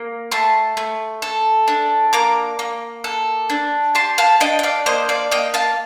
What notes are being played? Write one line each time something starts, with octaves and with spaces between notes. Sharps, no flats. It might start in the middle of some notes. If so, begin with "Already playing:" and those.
Already playing: A#3
A3 A5 C6
A3
A4
D4
A#3 A#5 D6
A#3
A4
D4
G4 A5 C6
F5 A5
D4 D#5 G5
G5
D5 F5
A#3 C5 D#5
D5 F5
A#3 D#5 G5
F5 A5